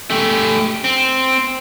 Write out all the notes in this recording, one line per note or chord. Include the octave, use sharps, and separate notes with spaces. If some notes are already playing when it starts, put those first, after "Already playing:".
A3 G4
C4